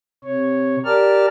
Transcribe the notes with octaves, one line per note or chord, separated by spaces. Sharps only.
C3 C#5
G4 A#4 D5 A5 F6